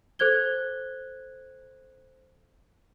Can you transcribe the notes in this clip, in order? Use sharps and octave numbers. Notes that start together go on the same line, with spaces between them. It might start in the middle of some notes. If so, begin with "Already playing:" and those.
A4 C5 F#6 G#6 G7